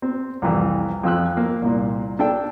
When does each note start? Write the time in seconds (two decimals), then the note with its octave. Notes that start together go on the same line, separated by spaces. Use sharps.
0.02 C4
0.42 C2 F2 E3
1.03 F2 F3 E6 F#6
1.37 A#3
1.62 C2 A#2
2.19 D4 A4 G5